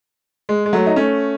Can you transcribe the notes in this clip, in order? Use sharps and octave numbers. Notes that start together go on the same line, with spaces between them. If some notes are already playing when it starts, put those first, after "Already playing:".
G#3
G#3
F#3 A3
D#4
A3 C#4